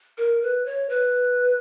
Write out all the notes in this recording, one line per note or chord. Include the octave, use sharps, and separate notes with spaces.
A#4
B4
C#5
B4